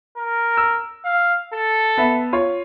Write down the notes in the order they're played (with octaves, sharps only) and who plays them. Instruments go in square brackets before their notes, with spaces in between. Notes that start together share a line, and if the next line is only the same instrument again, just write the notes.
[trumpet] A#4
[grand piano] E6
[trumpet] F5
A4
[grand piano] B3 E5
F4 C#5